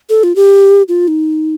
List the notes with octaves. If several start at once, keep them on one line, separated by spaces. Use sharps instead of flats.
A4
F4
G4
F4
D#4